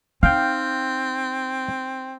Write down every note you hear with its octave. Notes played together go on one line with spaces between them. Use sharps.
C4 D#4 F5 G5